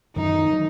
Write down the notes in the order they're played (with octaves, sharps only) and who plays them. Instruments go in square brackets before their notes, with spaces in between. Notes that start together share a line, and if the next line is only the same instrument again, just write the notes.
[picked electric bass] F#2 D#3 F#3 [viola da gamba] D#4
[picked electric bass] D#3 F#3